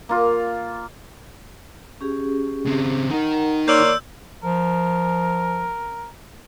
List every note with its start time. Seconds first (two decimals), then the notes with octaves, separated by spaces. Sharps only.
0.09 A#3 F4
2.01 C#4 G4 G#4
2.65 C#3 C4
3.10 D#3 D#4 A#4 F#5 A#5
3.68 A#3 C#5 D5 C6 E6 G6
4.43 F3 A#4